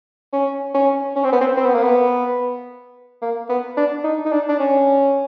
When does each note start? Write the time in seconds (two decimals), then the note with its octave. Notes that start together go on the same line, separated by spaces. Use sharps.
0.33 C#4
0.74 C#4
1.16 C#4
1.24 C4
1.32 B3
1.41 C4
1.57 C4
1.66 B3
1.74 A#3
1.83 B3
3.22 A#3
3.49 B3
3.77 D4
4.04 D#4
4.25 D#4
4.32 D4
4.49 D4
4.60 C#4